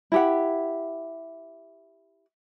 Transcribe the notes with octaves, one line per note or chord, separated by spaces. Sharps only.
E4 G4 F#5